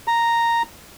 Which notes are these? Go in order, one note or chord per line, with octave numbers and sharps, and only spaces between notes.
A#5